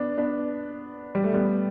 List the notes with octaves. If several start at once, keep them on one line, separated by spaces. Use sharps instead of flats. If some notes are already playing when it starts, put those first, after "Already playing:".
Already playing: B3 D4
B3 D4
G3
A3
G3 B3